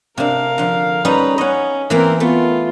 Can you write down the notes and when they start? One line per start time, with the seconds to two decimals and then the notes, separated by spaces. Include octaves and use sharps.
0.18 C3 D4 A#4 F5
0.58 D3 F3
1.05 G3 C#4 D#4 B4 A#5
1.38 C#4 D#5 F#5
1.90 E3 A#3 C4 A#4 B4
2.20 A3 B3 F4